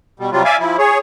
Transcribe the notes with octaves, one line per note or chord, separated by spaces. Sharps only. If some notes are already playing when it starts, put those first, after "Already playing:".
B2 G3
C3 F#3 G3 F4
D5 E5 F5 G#5
F3 E4
G#4 C#5